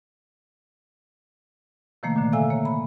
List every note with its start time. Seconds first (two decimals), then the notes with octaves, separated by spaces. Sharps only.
2.03 C3 D#3 F3 A3 A#3
2.16 A#2 D3
2.32 C3 A4 E5 F5 G#5 E6
2.50 A#3 C#5
2.65 B5